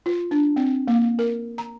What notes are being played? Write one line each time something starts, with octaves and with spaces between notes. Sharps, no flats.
F4
D4
C4
A#3
A#4
A#5